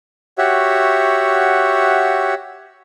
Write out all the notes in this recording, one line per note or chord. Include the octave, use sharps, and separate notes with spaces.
F#4 G4 C#5 E5 F#5